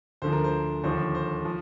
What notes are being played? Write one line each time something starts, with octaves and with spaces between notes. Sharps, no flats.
D2 D3 F3 C5
A#4
C5
D#2 D3 F3 C5
C5
F3